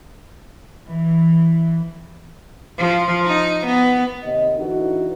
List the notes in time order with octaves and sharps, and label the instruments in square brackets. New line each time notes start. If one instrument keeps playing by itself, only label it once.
[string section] E3
[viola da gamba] F3
D#4
B3
[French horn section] D#2 C3 D#5
D3 E3 D#4 F#4